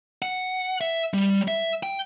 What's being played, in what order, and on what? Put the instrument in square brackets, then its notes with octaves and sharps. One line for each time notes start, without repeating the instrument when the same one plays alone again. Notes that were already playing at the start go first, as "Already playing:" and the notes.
[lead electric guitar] F#5
E5
G3
E5
G5